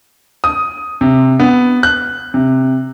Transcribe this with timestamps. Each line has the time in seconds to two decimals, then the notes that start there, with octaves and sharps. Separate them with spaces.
0.44 D#6
1.01 C3
1.40 B3
1.83 F#6
2.34 C3